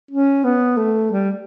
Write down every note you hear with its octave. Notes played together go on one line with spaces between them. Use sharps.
C#4
B3
A3
G3